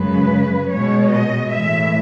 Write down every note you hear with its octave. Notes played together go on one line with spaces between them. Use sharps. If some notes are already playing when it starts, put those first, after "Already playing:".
Already playing: F#2 C#3 G#3 B4
B2 G#3 C#5
D#5
A2 E3 G#3 E5